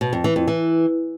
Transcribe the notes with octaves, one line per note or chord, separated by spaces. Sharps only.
B2
F2
E3
F2
E3